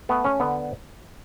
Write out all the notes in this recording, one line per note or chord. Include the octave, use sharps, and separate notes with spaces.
A3 B3
C#4
D3 B3